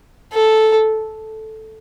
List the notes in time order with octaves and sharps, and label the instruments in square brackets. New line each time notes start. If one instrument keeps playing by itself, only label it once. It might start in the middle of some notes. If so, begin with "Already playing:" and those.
[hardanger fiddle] A4